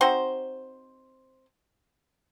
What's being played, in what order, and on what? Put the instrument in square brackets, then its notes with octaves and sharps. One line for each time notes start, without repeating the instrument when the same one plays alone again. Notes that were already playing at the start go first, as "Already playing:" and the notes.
[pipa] C4 D#4 F#4 C5